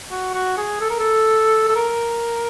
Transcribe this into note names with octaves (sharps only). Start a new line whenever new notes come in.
F#4
F#4
G#4
A4
A#4
A4
A4
A#4